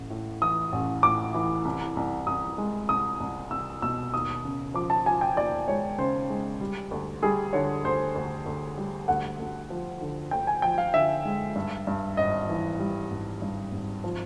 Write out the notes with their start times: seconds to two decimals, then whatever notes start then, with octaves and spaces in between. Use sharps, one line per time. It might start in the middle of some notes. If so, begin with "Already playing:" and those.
Already playing: A1 A2
0.10 A2
0.42 E3 D#6
0.72 A1
1.03 A2 D6
1.34 E3
1.65 C2
1.97 C2
2.27 C2 D#6
2.58 G#3
2.89 C2 D#6
3.20 C2
3.51 C2 E6
3.82 B2 E6
4.13 D#2 D#6
4.44 C#3
4.74 F3 D6
4.90 A5
5.06 F3 G#5
5.21 G5
5.36 D#2 D5
5.68 G#3 C#5
5.98 C#3 C5
6.30 G#3
6.61 G3
6.91 D2
7.23 G3 G#4
7.53 D3 C#5
7.84 D2 C5
8.15 D2
8.46 D2
8.78 G3
9.08 D2 F#5
9.40 D2
9.70 F3
10.01 D3
10.31 D2 G5
10.47 G#5
10.62 F3 G5
10.78 F5
10.94 D3 E5
11.25 G#3
11.55 G2
11.87 G2
12.17 G#1 D#5
12.49 E3
12.79 G3
13.10 G#1
13.42 G2
13.72 G#1
14.04 F3